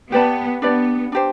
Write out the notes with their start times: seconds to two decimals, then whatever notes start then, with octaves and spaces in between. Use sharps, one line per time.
0.11 B3 G4 B4 D5 A5
0.62 B3 D4 G4 B4 D5
1.12 D4 G4 C5